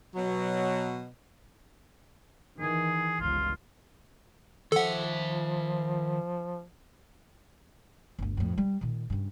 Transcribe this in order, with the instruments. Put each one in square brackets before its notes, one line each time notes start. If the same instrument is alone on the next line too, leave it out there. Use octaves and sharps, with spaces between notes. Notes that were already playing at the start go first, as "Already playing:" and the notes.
[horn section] B2 F#3
[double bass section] D#3 E3 [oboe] G#4
[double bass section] G1 C#2 [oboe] F4
[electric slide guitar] D#3 E5 [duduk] F3 [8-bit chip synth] A4 F#5
[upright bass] G1 D2
F2 A2
G3
A#2 D#3
G2 C#3